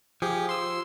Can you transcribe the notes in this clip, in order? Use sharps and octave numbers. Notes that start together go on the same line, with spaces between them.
F3 G4 G#4
C6 E6